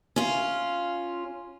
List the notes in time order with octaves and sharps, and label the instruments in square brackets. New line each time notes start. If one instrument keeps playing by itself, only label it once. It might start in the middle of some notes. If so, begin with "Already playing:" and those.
[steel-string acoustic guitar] C#4 F4